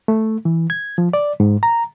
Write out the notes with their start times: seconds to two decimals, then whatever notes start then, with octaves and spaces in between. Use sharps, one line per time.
0.08 A3
0.45 E3
0.70 G#6
0.98 F3
1.13 D5
1.40 G#2
1.63 A#5